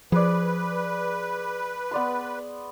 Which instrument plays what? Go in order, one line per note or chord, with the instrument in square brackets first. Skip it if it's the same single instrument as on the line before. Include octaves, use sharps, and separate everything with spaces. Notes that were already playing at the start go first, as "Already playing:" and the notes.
[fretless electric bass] F3 [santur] G#4 D5 [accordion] B4
[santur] B3 D5 C6